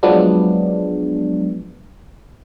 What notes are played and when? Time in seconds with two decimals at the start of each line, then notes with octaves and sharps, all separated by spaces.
0.03 F3 F#3 G#3 B3 D4